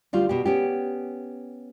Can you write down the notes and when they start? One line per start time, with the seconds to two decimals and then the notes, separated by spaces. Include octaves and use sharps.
0.13 D2 G3 F4
0.29 B2 G4
0.46 B3 C#4 G4